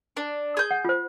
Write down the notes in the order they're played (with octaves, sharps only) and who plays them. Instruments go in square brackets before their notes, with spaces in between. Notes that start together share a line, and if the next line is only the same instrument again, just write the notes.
[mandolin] D4
G#4 G6
[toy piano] F#5
F4 C5